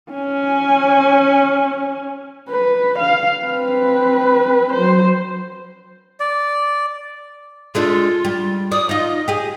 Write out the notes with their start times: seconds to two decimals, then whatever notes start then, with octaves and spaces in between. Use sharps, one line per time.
0.12 C#4 G#5
2.50 B4
2.99 F5
3.44 C4 B4
4.73 F#3 C5
6.20 D5
7.75 G#3 A3 D4 F4
8.25 G3
8.72 D5 D#6
8.89 D#4 F4 D#5
9.28 G4 G#4